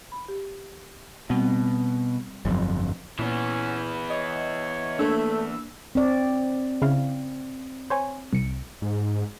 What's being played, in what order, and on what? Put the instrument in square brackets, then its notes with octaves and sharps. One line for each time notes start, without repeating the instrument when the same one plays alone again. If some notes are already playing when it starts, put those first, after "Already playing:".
[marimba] B5
G4
[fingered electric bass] B2 [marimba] G3 C4
[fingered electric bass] G1 F2 [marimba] F#3
[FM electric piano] A#2 [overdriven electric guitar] E3 B3 [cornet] C#4
[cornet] C#5 [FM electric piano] D#5
[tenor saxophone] A3 [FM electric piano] A#3 D4 E6
[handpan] C4 D5
[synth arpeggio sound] C#3 E4 F5
C5 C#5 G#5
C2 C#7 D7
[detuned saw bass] G#2